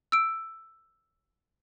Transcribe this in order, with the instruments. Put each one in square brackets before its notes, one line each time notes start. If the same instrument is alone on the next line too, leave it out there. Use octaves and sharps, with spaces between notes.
[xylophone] E6 D7